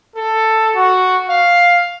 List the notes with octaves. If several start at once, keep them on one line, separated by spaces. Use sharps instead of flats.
A4
F#4
F5